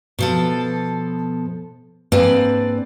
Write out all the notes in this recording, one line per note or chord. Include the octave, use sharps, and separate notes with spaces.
B2 F3 A4
G#2 A#3 C4 D4 B4 D5